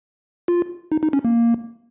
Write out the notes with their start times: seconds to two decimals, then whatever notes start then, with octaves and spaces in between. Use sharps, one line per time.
0.48 F4
0.92 D#4
1.03 D#4
1.13 C#4
1.25 A#3